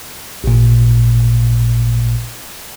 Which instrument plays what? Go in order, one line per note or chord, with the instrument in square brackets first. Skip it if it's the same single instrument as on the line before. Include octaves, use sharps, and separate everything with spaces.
[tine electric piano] A1 A#2